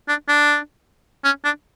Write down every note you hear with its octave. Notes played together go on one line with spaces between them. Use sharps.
D4
D4
C#4
D4